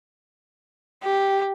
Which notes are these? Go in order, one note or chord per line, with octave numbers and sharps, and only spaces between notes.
G4